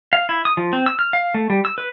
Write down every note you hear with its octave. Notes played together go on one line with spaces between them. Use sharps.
F5
E4
D#6
F3
C4
E6
F6
F5
A3
G3
E6
B4